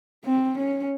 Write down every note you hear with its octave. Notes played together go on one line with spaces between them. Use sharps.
C4
C#4